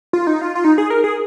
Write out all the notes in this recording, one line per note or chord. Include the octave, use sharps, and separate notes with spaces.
F4
D#4
F4
F4
D#4
G#4
A#4
G#4